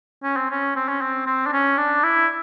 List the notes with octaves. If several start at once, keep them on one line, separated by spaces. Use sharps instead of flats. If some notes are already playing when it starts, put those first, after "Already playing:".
C#4
C4
C#4
C4
C#4
C4
C4
D4
C#4
D4
E4